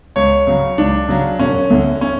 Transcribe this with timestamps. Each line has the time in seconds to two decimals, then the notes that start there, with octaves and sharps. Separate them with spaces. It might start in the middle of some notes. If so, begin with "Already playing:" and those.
0.16 C#2 C#5
0.47 C#3 F#3
0.78 C#2 D4
1.09 C#3 F#3
1.39 E1 C#4
1.70 D2 D3
2.01 C#4